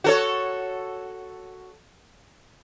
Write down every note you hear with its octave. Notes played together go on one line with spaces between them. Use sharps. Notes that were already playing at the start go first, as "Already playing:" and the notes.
F#4 A4 C#5